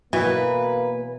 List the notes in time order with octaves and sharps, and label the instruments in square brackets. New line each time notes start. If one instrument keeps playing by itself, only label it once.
[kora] B2 F#3 F#5 [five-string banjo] E3 [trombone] A#3 [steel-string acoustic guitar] B4